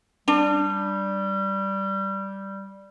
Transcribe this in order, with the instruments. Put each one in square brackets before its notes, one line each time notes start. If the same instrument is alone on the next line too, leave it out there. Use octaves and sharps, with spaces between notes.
[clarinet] G3 [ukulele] D4